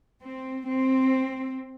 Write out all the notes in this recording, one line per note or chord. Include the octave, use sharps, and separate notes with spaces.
C4
C4